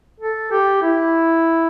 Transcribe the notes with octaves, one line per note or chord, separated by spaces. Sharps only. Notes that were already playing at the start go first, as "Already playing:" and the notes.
A4
G4
E4